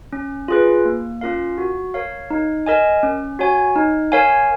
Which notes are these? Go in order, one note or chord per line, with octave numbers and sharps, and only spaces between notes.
C#4
F4 G#4 B4
A#3
C#4 F4 A#4 F5
F#4
A#4 C#5 F5
D#4
A#4 D#5 G#5
C#4
F#4 C#5 G#5
D#4
A#4 C#5 F5 G#5